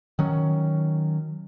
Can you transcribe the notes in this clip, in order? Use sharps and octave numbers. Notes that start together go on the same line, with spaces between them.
D#3 F#3 C#4